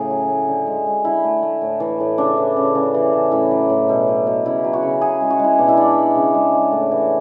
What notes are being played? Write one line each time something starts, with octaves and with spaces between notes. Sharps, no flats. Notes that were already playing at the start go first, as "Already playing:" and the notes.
Already playing: A2 C#3 G#4
F#3
A2
D3
G#3
G#3
D3 E4
A3
A3
A2
E3
A2
C#3 D4
E3
C#3
C#3
E3
C#3
A2 E4
F#3
A2
B2
F#3
B2
C#3 E4
F#3
F#4
C#3
C#3 G#4
G#3
F#4
G#3 E4
B2 D4
E4
G#3 D4
G#3
C#3
G#3
G#3
A2
E3